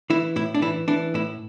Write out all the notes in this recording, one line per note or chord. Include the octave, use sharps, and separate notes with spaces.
E3 E4
A2 E4
D4
E3 E4
E3 D4
A2 E4